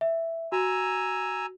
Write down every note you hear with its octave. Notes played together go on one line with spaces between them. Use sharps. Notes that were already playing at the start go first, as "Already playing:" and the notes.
E5
F#4 G#5 A#5 E6